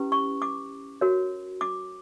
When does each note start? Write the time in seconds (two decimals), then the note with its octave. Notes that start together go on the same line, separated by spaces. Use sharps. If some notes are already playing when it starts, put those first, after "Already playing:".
Already playing: C#4 E4 G4 B4
0.12 C#6
0.42 D6
1.01 F#4 A#4 C#5
1.61 D6